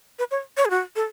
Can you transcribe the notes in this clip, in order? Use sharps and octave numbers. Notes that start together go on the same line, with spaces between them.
B4
C#5
C#5
G#4
F#4
A4